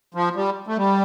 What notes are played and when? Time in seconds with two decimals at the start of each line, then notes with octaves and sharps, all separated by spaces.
0.14 F3
0.35 G3
0.67 A3
0.77 G3